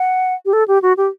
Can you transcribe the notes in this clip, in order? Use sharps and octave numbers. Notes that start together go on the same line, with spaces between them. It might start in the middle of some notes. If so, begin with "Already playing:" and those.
Already playing: F#5
G4
A4
G4
F#4
G4